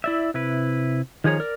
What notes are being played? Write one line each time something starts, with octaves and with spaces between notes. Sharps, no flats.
E4 D5 E5
C3 E4 B4
D#3 F3 G#4 C#5 A#5
A#4 D5